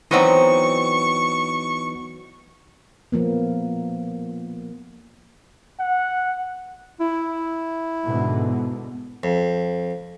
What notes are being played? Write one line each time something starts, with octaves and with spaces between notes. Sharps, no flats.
E3 F#3 B3 C4 D#4 D#5 C#6
F3 A#3 B3
F#5
E4
G#2 B2 D3
F2